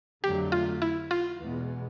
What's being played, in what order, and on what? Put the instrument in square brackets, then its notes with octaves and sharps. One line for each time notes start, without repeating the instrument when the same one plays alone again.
[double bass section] F2 D3 F#3 A3 [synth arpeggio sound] G4
[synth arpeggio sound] F4
E4
F4
[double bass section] E2 B2 G#3 B3